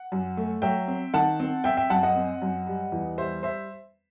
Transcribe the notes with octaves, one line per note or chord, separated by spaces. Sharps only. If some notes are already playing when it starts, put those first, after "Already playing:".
Already playing: F#5
F#2
A3
F#3 E5 G5
C4
D#3 F#5 A5
C4
C4 E5 G5
E5 G5
F#2 F#5 A5
D#5 F#5
C4
F#2
G3
E2
G3 C5 E5
C5 E5